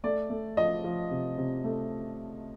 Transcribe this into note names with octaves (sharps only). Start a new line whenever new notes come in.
A3 D5
A3
F3 D#5
F3
C3
C3
A3